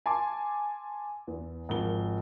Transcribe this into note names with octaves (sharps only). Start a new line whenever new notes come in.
G#5 A5 C6 D6
E2
G#1 F3 A#4 G7